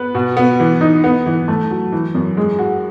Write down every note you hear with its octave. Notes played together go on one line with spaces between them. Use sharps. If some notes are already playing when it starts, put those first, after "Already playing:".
Already playing: B3 B4
B2
B3
E3
D#4
B3
E3
A3
F#3
E3
F#2
G#3
F#4